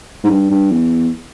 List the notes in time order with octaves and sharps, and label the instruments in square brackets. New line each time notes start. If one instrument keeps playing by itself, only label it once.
[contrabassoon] G#2
G2
G2
E2